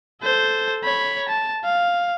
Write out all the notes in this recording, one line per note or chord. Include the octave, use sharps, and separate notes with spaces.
A4 C5
C#5 B5
A5
F5